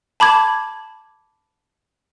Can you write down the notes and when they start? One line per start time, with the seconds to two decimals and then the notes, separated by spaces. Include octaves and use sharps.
0.20 A5 B5 D6 G#6